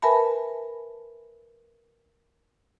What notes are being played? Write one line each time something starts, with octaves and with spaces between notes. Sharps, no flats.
A#4 B4 E5 G#5 A5 B5